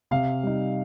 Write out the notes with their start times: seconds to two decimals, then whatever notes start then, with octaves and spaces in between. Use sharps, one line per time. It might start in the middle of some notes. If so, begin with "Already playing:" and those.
0.11 C3 F5
0.43 G3 D#4